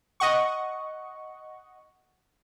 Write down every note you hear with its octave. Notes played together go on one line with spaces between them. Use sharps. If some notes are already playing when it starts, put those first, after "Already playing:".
D#5 F#5 C#6